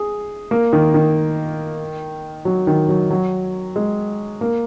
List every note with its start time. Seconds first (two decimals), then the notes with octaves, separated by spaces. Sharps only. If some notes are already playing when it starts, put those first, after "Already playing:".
Already playing: G#4
0.51 A#3
0.73 D#3
0.94 D#3
2.45 F#3
2.67 D#3
2.88 F#3
3.10 F#3
3.76 G#3
4.41 A#3